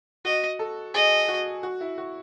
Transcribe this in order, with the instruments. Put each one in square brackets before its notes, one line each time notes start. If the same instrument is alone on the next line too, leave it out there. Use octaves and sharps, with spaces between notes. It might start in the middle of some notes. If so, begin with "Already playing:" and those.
[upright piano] F#4 [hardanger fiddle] D#5
[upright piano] A4
[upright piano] G#4 [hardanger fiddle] D#5
[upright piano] F#4
F#4
E4
F#4